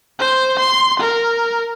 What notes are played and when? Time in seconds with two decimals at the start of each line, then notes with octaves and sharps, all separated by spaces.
0.19 C5
0.59 C6
1.00 A#4